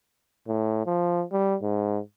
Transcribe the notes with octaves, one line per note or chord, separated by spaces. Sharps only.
A2
F3
G3
G#2